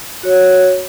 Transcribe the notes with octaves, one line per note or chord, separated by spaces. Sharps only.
F#4 C#5